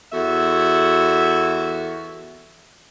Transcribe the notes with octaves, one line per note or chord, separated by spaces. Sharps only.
E2 F#4 A4 E5